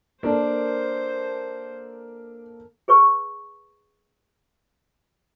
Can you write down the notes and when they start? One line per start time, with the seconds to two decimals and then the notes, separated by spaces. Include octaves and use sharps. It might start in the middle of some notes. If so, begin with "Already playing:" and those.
0.23 A#3 D4 A4 A#4 C5
2.88 G#4 B4 C#6